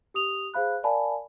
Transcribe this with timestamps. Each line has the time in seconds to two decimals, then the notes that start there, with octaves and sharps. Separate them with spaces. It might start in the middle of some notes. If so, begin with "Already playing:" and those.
0.14 G4 D#6 F7
0.54 G#4 C5 F5 B5 F#6
0.83 A#4 D5 F5 G#5 A5 B5